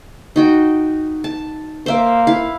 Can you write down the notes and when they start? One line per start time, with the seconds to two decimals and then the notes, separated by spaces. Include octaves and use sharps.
0.36 D#4 F#4 G5
1.24 A5
1.86 A#3 C5 E5 D6
2.27 E4 F5